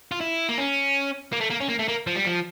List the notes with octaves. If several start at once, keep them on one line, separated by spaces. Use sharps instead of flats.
F4
E4
A#3
C#4
A#3
A3
A#3
C#4
A#3
A3
A#3
F3
G3
F3